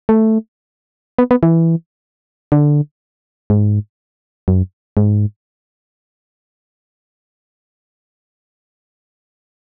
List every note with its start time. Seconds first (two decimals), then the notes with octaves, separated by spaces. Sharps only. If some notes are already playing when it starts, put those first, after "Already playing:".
0.09 A3
1.19 B3
1.31 B3
1.43 E3
2.52 D3
3.50 G#2
4.48 F#2
4.97 G#2